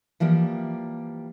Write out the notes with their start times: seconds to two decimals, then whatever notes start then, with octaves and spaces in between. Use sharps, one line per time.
0.20 E3 F3 G3 A#3 G5